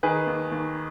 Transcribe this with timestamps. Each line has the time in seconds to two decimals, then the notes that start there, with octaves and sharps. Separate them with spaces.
0.03 D#3 G#4 B4
0.27 D#2
0.52 D#2